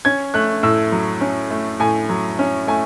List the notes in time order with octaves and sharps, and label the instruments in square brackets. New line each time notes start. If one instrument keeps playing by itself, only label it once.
[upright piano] C#4 G#6
A3 F#6
A2 E6
F#3
C#4
A3
A2 G#5
F#3
C#4
A3 G#5